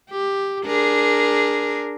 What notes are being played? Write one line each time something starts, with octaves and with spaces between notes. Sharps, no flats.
G4
D4 G#4 A#4